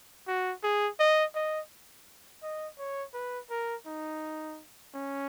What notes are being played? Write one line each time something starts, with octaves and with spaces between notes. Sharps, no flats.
F#4
G#4
D#5
D#5
D#5
C#5
B4
A#4
D#4
C#4